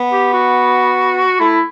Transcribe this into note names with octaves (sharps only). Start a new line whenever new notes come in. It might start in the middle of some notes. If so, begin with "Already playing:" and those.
Already playing: B3
G4
F#4
A3 E4